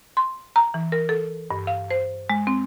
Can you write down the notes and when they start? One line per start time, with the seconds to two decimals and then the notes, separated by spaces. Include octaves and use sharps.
0.17 C6
0.56 A#5
0.74 E3
0.92 A#4
1.09 A4
1.51 G2
1.67 F5
1.91 C5
2.30 G#3
2.47 C4